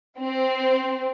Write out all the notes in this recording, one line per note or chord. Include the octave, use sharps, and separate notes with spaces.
C4